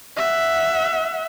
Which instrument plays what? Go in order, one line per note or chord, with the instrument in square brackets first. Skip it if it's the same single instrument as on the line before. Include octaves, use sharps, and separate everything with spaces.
[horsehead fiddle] E5 F#5